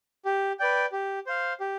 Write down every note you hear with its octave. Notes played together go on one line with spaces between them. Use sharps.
G4
B4 D5 G5
G4
C5 F5
G4